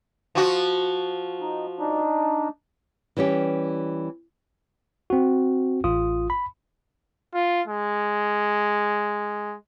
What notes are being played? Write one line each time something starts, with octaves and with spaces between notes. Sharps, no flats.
F3 F#4
D#4
D4 D#4
E3 G3 C#4 G4
C4 F#4
A1 F4 D#6
B5
F4
G#3